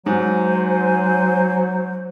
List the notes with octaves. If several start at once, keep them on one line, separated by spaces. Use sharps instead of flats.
G#2 F#3 C5 G#5